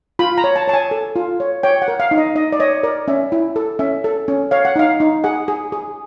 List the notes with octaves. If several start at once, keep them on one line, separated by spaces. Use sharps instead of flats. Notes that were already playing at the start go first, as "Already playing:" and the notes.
F4 B5
A#5
C#5
A5
C#5 A5
G#5
A4
F4
C#5
C#5 G5
F#5
A#4
F5
D#4
D#5
D#4 D#5
D5
C#5 D#5
A#4 D5
C#4 E5
E4
A4
C#4 E5
A4
C#4
C#5 F5
F#5
D#4 F5
D#4
G#4 F#5
G#4
G#4